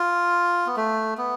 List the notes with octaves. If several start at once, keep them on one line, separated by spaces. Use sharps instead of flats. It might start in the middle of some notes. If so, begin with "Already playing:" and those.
Already playing: F4
B3
A3
B3